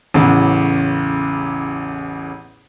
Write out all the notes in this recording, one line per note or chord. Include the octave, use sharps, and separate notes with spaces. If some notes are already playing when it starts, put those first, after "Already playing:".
A1 E2 C#3